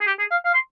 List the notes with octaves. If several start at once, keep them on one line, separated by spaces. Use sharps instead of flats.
G#4
G4
G#4
F5
F5
C6